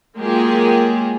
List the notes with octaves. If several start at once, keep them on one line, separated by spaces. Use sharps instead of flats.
F#3 G#3 A#3 F4 G4 G#4